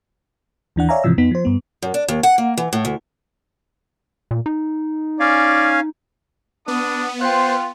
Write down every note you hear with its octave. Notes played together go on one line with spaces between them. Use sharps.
D#2 E3 D4 F#5
C#5 D5 E5 F5 G#5 A#5
G#2 C3 E3 F3 E6
F2 B3 D#4 B6
F3 C5
G2 B3
F#2
D4
D#2
F#5
A#3
E3
A2
D2
A#2
D#4
C#4 D5 F5 G#5
B3 D4 D#6
F4 C5 G5 F#6